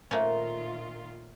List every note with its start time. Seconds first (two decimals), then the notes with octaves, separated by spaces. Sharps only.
0.11 A#2 D#3 A3 A#3 C#4 F4 C5 E5